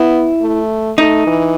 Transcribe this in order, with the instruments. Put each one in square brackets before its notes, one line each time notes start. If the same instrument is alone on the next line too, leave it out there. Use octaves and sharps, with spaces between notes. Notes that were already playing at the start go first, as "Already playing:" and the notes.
Already playing: [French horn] B3 [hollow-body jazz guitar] E4
[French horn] A3
[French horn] A3 [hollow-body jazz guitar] D#4
[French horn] E3